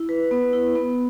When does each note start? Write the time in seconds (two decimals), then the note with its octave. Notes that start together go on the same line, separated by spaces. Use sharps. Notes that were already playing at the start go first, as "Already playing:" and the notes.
Already playing: E4
0.09 B4
0.31 B3
0.53 E4
0.76 B3